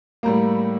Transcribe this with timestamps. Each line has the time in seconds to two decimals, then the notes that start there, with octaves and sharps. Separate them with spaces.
0.23 A2 G3 A#3 A#5